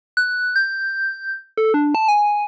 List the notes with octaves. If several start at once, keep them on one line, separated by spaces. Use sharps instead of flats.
F#6
G6
A4
D4
A5
G#5